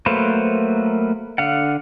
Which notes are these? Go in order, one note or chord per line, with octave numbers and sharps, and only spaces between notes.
F#3 A3 A#3 B4 C5
D3 F5 F#5